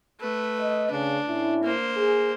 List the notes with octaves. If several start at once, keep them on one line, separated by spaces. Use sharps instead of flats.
A3 B4
D#5
C#3 D4
A2 C#4 E4
A#3 C5
G#4